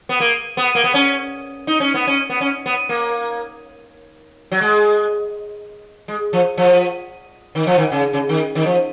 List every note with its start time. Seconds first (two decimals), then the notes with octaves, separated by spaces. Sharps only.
0.09 B3
0.20 A#3
0.57 B3
0.75 A#3
0.84 B3
0.94 C#4
1.67 D#4
1.80 C#4
1.94 B3
2.07 C#4
2.30 B3
2.41 C#4
2.66 B3
2.89 A#3
4.52 F#3
4.61 G#3
6.08 G#3
6.33 F3
6.58 F3
7.55 D#3
7.67 F3
7.78 D#3
7.92 C#3
8.13 C#3
8.29 D#3
8.55 D#3
8.66 F3